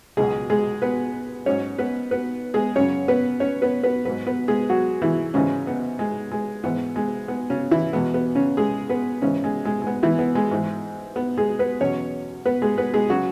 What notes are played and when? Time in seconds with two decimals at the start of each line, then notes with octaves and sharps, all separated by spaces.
0.17 C#2 B2 F#3 G#3 G#4
0.50 G#3 G#4
0.82 B3 B4
1.46 G#2 F#3 C#4 C#5
1.78 B3 B4
2.11 B3 B4
2.54 G#3 G#4
2.75 F#2 C#3 F#3 C#4 C#5
3.08 B3 B4
3.40 C#4 C#5
3.62 B3 B4
3.83 B3 B4
4.05 G#2 F#3 B3 B4
4.27 B3 B4
4.48 G#3 G#4
4.69 F#3 F#4
5.02 E3 E4
5.34 G#2 C#3 E3 G#3 C#4
5.67 B3
5.99 G#3
6.31 G#3
6.64 G#2 E3 G#3 B3
6.96 G#3
7.28 B3
7.50 C#3 C#4
7.71 E3 E4
7.93 E2 B2 G#3 B3
8.14 B3
8.35 C#3 C#4
8.57 G#3 G#4
8.90 B3 B4
9.22 G#2 C#3 E3 G#3 C#4
9.44 G#3
9.65 G#3
9.82 G#3
9.87 B3
10.03 E3 E4
10.19 B3
10.35 G#3
10.51 G#2 E3 G#3
11.16 B3
11.38 G#3 G#4
11.59 B3 B4
11.81 E2 B2 F#3 C#4 C#5
12.46 B3 B4
12.62 G#3 G#4
12.78 B3 B4
12.94 G#3 G#4
13.10 C#3 F#3 F#4